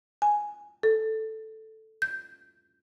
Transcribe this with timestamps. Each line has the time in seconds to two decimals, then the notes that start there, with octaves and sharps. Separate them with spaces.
0.22 G#5
0.83 A4
2.02 G6